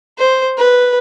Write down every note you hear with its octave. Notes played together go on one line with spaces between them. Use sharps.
C5
B4